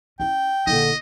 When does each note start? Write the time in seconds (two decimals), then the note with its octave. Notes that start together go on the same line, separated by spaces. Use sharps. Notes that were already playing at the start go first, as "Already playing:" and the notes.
0.20 C#4 E4 G5
0.67 A#1 D3 E4 D#5